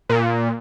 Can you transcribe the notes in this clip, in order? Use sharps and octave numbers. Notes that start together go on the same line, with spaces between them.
A#2